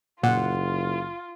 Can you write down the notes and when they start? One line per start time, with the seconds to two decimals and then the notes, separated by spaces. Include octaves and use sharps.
0.23 F#1 A#2 F4 F#5